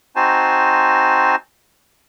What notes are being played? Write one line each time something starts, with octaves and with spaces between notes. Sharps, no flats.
C4 D#4 F#4 C5 G#5 A5